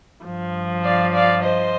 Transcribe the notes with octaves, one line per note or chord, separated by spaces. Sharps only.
G2 F3
D5 F5
D5 F5
C5 D#5